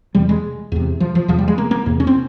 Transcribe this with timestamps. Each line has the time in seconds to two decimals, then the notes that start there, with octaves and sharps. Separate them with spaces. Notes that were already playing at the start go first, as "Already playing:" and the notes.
0.15 E2 C3 G3
0.29 G#3
0.72 E2 C3
1.00 F3
1.15 F3
1.28 E2 C3 F3
1.38 G3
1.48 G#3
1.58 A#3
1.71 A#3
1.86 E2 C3
2.00 C#4
2.07 C4